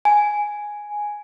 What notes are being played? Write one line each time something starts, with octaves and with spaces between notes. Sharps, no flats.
G#5